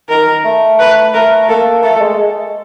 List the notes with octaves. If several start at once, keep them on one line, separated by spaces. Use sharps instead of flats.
D#3 A#4
A3
B4
A3 A#4
A#3 A4
A3 A4
A3
G#3